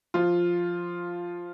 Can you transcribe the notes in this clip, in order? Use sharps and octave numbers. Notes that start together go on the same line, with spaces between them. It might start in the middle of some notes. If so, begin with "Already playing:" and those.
F3 F4